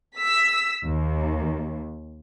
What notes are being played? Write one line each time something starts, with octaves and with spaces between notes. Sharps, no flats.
E6 B6
D#2